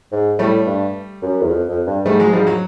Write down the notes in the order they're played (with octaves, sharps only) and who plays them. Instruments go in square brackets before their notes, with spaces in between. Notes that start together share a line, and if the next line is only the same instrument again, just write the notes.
[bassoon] G#2
[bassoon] A2 [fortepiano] G3 A3
[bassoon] G2
F#2
E2
F2
F2
G2
[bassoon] G#2 [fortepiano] G3 A3
[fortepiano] F#3 G#3
[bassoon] G#2 [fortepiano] F3 G3
[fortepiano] F#3